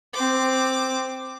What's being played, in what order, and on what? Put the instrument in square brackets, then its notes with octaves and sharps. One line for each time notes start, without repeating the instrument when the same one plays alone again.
[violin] C4 D6